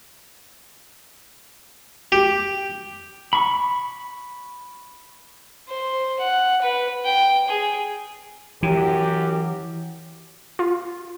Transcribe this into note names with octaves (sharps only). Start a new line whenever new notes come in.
G4
B5 C#6
C5
F#5
B4
G5
G#4
F#2 E3 F#3 G4
F4